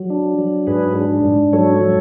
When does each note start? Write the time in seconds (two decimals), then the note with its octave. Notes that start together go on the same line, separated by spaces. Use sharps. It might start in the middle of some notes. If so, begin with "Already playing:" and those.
Already playing: F#3
0.10 D4
0.38 F#3
0.67 G#2 G#4 B4
0.95 D4
1.25 G#2
1.53 F#3 A4 C#5
1.81 F#3